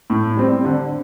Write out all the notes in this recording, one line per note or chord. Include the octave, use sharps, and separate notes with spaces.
A2
G3 C4
D3